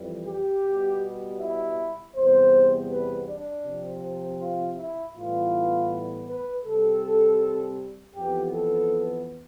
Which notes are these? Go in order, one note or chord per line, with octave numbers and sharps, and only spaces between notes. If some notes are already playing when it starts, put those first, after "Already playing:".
Already playing: F2 E3 G3
G4
B2 G3 B3
E4
E2 C3 G3 B3 C5
B4
D4
C3 F3 C4
F4
E4
A2 E3 G3 B3 F4
B4
C3 G3 C4 A4
F2 E3 B3 G4
A4